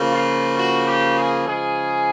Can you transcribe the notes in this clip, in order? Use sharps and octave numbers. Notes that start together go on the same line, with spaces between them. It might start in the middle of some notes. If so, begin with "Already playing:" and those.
Already playing: C#3 F3 A#3
F4
F#4
G4
G#4
C#3 F3 G#3 G#4